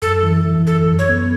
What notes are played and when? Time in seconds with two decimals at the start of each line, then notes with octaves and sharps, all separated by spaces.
0.02 F#2 A4
0.23 E3
0.45 E3
0.66 F#2 A4
0.88 F#2
0.99 C#5
1.09 B3